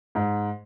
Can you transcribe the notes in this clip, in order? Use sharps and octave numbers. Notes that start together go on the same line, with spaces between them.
G#2